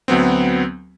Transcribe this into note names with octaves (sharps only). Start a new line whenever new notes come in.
D2 F#3 B3 C4